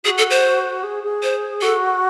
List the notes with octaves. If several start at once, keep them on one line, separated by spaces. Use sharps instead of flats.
F#4 G#4
A4
C5
G#4
G#4
C5
F#4 A4